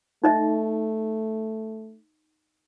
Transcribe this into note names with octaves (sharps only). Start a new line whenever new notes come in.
A3 D#4 D#5 E5